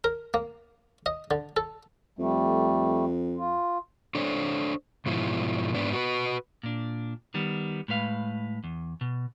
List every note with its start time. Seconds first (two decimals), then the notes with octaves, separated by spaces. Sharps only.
0.04 A#4
0.34 A#3
1.06 D#5
1.31 D3
1.57 A4
2.19 F2 G3 A3
3.37 F4
4.15 D4 A4 C5 C#5
5.06 G#2 B2 F3 E4
5.75 G#2 B3 D4
5.93 F#4 B4
6.63 A#2 D4
7.34 D#3 G3 B3
7.88 A2 G#3 B4 F5
8.64 E2
9.01 B2